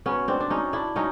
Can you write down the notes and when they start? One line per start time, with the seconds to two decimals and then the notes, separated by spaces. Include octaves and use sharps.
0.06 F#3 B3 C#4
0.28 C4 D4
0.40 D4
0.50 F#3 C#4 D#4
0.73 D4 E4
0.96 F#3 C#4 D#4